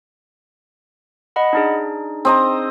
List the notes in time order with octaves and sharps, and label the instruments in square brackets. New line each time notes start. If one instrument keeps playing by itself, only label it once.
[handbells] D#5 F#5 B5
D4 D#4 G#4
[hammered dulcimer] C4 D#5 A#5